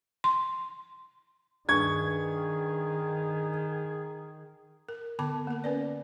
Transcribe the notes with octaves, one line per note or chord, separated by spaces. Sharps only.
C6
G2 D#3 G#4 C#6 G#6
A#4
D3 B3 A5 D6
A#3 A#4
C#4 B4 D5